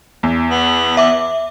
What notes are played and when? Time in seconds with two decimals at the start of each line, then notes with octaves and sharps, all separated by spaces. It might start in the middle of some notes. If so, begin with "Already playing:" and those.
0.23 E2
0.51 B3
0.97 E5 D6